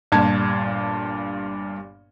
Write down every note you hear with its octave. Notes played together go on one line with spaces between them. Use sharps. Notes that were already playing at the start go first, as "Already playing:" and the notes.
G1 G2 A#2 A5 G#6